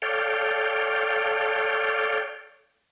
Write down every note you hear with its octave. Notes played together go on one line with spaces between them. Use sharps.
A4 C#5 D5 F5 G5